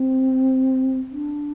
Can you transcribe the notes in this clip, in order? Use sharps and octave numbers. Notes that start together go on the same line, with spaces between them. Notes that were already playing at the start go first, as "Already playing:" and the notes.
Already playing: C4
D4